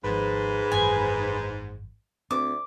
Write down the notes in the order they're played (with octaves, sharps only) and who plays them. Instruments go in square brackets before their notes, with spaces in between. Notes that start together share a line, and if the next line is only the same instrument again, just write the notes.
[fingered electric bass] G#1 F3 [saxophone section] G#2 [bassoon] B4
[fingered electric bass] G#1 F#2 E3 [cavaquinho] G#5
[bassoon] D2 [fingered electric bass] C4 [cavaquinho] D6